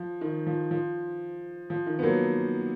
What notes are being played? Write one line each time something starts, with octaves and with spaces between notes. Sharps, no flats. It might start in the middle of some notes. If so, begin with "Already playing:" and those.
Already playing: F3
D#3
F3
F3
F3
D#3
B3
F#3 A#3